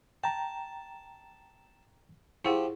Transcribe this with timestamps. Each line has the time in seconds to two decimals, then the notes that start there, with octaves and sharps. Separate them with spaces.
0.24 G5 A5 A#5
2.45 F3 E4 G4 G#4 F#5